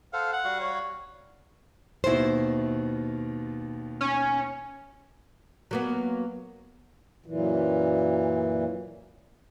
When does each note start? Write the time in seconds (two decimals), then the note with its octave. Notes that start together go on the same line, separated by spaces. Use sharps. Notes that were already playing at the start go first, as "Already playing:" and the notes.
0.13 A4 C5 F5 F#5
0.33 F#5
0.44 G3 F#4 F5
0.60 C#5
2.04 D#2 B2 D#3 E4 C5
4.01 C#4
5.71 F#3 A#3 B3
7.26 F#2 A#2 E3